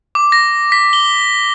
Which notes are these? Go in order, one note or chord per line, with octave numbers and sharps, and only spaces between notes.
D6
A#6
B6
G7